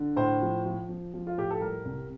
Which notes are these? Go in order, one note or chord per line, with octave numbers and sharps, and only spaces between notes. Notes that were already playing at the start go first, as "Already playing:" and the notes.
Already playing: D3
A2 C5
F3
F3
F3
F3
F4
A2 G4
A4
G3 A#4
C2